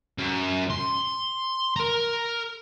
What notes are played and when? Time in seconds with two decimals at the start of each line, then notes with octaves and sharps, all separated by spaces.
0.18 F#2
0.70 C6
1.76 A#4 A#5